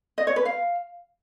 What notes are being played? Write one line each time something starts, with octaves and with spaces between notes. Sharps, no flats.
D#5
C#5
B4
F5